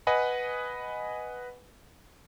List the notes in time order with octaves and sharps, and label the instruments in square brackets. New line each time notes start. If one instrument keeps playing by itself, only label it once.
[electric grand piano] B4 D#5 F#5 G#5 B5